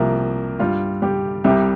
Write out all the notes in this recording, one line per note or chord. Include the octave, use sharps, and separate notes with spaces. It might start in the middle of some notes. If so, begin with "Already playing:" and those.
Already playing: C2 C3 F3 A#3 A#4
G2 G3 F4
G3 G4
C2 C3 G3 G4